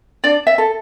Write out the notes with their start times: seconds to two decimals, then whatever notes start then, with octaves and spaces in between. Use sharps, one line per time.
0.24 D4 D5
0.47 E5
0.58 A4